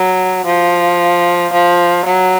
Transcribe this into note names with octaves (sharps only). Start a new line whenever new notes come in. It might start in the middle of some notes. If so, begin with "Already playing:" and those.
Already playing: F#3
F3
F3
F#3